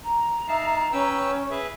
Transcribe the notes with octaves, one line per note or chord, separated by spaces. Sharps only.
A#5
D#4 E5 F5 A5
C#4 B4 G5 E6
G#4 B4 E5